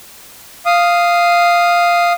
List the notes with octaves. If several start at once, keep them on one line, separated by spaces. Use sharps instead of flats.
F5 D#6